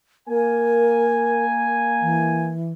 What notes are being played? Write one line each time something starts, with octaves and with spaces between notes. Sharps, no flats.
A#3 A#4 G#5
E3